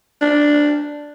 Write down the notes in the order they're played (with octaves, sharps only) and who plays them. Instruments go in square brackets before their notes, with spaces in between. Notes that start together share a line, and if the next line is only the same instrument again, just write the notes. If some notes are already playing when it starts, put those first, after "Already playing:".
[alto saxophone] D4